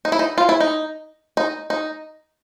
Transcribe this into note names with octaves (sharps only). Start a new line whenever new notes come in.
D#4
E4
D#4
F4
E4
D#4
D#4
D#4